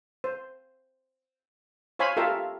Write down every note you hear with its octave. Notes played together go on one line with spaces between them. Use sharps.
C5
C5 C#5 F5 G#5 B5 C6
F4 G4 A4 A#4 E5 F5